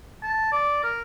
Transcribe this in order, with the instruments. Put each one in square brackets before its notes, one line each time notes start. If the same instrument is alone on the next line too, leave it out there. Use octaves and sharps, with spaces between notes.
[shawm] A5
D5
A#4